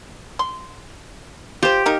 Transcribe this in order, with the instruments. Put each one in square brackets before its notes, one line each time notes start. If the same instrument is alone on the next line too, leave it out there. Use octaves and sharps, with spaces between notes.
[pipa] C6
[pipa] F4 C5 [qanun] G4
[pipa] A#3 D#4 A#4